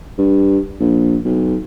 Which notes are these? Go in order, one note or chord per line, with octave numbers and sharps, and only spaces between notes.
G2
A#1
B1